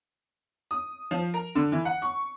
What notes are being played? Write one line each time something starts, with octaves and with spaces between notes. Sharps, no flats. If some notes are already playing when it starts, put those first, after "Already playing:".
D#6
F3
A#4
D3
E3
F#5
C#6